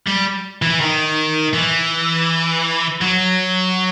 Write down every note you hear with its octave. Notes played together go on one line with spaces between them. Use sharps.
G3
E3
D#3
E3
F#3